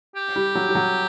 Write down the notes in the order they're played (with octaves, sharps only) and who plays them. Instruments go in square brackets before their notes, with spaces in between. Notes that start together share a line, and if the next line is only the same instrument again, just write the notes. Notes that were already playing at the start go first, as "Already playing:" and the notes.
[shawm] G4
[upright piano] G3
F#3
G3
F#3